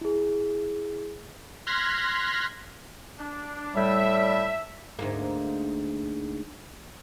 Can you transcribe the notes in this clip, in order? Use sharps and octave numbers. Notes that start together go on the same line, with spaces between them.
E4 G#4
C6 F6 F#6 G#6 A#6 B6
D4
A2 G3 E5
D2 G#2 A#3